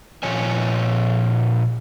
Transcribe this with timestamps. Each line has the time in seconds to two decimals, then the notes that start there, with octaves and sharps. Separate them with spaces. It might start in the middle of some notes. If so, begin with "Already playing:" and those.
0.23 A#2 F3 C#5 G#5